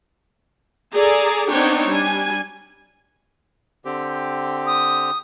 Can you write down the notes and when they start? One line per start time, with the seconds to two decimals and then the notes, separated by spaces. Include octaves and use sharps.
0.93 G#4 A4 D5 A#5
1.50 B3 C4 D4 D#4 C#5 G5
1.88 G3 D4 G#5
3.85 D3 C4 G4
4.66 D#6